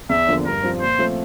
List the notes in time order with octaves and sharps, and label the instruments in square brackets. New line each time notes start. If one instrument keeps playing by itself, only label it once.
[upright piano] E2 [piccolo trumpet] E5
[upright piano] D3 F3 A#3 D4
[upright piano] G2 [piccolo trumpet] A#4
[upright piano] F3 C4
[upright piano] A#2 [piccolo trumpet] C5
[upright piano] F3 A3 C4